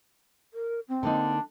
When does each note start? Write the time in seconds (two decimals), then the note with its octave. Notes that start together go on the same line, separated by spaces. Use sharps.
0.53 A#4
0.88 C4
1.03 D3 A#3 D4 D#4